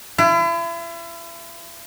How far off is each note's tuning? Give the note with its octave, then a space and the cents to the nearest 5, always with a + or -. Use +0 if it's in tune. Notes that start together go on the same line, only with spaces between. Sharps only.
E4 +40